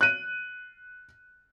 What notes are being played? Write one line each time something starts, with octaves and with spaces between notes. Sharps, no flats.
F#6 D#7